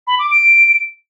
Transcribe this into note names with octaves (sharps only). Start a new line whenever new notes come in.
B5
D6
D7